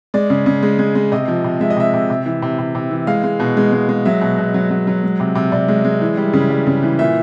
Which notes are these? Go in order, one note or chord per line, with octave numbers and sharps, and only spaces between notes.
G#3 D5
C#3
C#3
G#3
G#3
G#3
C3 D#5
F3
C3
G#3 E5
D#5
C3 E5
C3
C3
E3
C3
C3
C3
E3
G#3 F5
G#3
B2
G#3
G#3
G#3
F#3 E5
B2
B2
F#3
F#3
F#3
G#3
C3
C3
C3 D5
G#3
G#3
E3
G3
C#3
G3
C#3
E3
A#2 E5